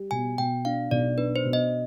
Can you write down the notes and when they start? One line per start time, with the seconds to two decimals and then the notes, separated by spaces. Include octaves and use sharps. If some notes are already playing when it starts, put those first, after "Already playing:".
Already playing: G3
0.11 B2 G#5
0.38 B2 G5
0.65 D4 F5
0.91 B1 D5
1.18 D4 B4
1.36 C5
1.45 B2
1.53 D#5